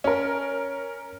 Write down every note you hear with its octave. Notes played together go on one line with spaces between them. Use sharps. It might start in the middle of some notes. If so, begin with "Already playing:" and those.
C#4 A#4